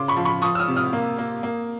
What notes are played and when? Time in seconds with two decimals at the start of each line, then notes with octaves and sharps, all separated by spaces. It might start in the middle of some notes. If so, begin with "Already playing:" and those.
Already playing: C#3 C6 D6
0.08 B5 C#6
0.16 F3
0.25 B5 C#6
0.42 F3 C#6 D#6
0.55 E6
0.59 D#6 F6
0.68 C3
0.77 D#6 F6
0.93 A#3
1.18 A#3
1.43 A#3